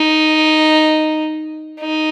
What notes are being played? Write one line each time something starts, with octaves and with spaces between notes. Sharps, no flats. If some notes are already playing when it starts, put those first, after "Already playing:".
Already playing: D#4
D#4